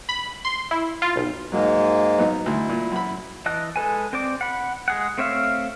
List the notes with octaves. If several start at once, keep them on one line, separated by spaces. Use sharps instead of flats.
B5
C6
E4
F4
B1
G#2 F#3 G#3 A#3
F#3 B3 D#4
D2 E4
A#2
F#2 B5
E3 D#5 A5 F#6
G#3 A4 B4 G#5
C4 C5 D5 D6
F#5 B5
G#3 G#4 F#5
A3 C4 C#5 E5 F5